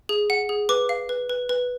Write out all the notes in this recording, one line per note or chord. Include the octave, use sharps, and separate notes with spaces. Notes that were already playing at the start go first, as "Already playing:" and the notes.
G#4
F#5
G#4
B4 D6
F5
B4
B4
B4